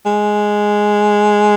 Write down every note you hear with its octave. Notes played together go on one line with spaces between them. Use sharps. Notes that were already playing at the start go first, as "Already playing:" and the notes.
G#3